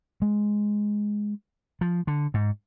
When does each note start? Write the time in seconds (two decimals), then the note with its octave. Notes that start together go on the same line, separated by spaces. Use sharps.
0.22 G#3
1.81 F3
2.07 D3
2.34 G#2